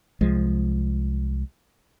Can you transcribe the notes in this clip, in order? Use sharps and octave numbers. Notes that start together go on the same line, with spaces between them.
C2 F3 G#3